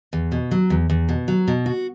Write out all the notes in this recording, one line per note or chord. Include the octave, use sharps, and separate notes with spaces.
E2
B2
F#3
E2
E2
B2
F#3
B2
F#4